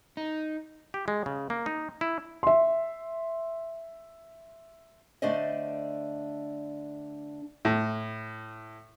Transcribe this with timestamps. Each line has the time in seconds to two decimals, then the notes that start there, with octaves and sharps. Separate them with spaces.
0.17 D#4
0.94 G4
1.08 G#3
1.26 C#3
1.50 A#3
1.66 D#4
2.01 E4
2.43 E5 C6
5.22 D3 A3 D4 C5 D5 D#5
7.65 A2